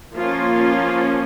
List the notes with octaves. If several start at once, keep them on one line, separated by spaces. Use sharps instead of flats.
F3 A#3 C#4 F4